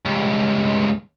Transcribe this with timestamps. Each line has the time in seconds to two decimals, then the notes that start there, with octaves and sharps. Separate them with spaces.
0.06 C#2 G2